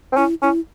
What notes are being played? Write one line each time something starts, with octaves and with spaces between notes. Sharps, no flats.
C4
C#4 E4
C#4 E4